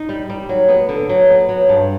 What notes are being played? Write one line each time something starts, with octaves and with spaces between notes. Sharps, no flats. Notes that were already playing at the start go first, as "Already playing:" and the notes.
Already playing: D#4
G3
G3
F#3
B3
D3
F#3
B3
F#3
G2